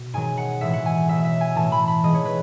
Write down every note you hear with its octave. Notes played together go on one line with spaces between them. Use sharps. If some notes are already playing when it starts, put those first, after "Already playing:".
Already playing: B2
G#2 D#3 F#3 G#5
F#5
A2 E3 G#3 E5
F#5
G#5
B2 F#3 A3 E5
E5
G#5
A2 E3 A3 A5
B5
B5
G#2 E3 G#3 D#5
C#5
B4